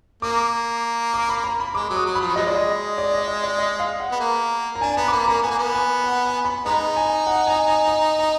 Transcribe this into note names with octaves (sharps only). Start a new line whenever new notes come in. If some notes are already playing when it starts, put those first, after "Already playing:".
A#3 D6
D6
B5
A#5
B5
G#3 D6
F#3
D#6
F#3
B5
F3
F#3
F3 G#3 D#5
D5
D#5
D5
D#5
D#5
D5
D#5
F5
F#5
B3
A#3
A#5
D4 G#5
B3 A#5
D6
A#3 B5
A#3 A#5
B3 G#5
A#3
B3
G#5
F#5
G#5
B5
G#3 B3 D#4 A#5
G#5
F#5
G#5
G#5
A#5
A#5